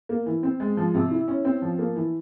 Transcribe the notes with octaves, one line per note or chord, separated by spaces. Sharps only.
A#3
E3
C4
G#3
F3
C3
E4
C#4
C4
F3
A#3
E3